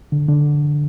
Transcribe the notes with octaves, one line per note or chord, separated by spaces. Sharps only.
D3
D3